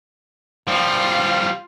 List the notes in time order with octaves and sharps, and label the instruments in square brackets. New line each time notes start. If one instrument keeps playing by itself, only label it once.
[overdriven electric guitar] F3 G3 [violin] F4 F5